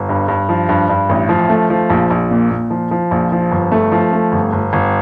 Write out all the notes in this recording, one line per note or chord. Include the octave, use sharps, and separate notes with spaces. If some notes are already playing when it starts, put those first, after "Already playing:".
Already playing: G1
G2
G2
F3
G2
G2
A1
F3
A3
F3
A#1
A#1
A#2
A#2
F3
F3
A#1
F3
G1
A3
F3
A3
G1
G1
G1